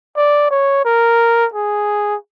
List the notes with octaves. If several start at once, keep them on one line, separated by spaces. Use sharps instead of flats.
D5
C#5
A#4
G#4